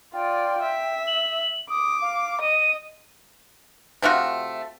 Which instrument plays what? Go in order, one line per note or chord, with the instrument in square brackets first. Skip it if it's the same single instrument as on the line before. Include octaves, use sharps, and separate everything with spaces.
[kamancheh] F4 D5 [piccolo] G5
[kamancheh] E5
[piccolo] F#7
[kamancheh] D6 [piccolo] D#6
[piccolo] F5
[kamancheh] D#5 [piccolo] D#7
[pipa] C3 A3 F4 F#4